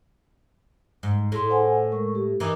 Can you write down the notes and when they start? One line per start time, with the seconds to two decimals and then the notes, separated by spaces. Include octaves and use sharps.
1.03 G#2
1.32 A2 A3 E4 G#4 C6
1.50 C5 F#5 G#5
1.92 G#3 A#4 C#6
2.15 G4
2.40 E3 D#4 A#4 D6